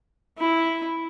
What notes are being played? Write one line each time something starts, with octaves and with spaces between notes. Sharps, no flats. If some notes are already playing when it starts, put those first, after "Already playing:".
E4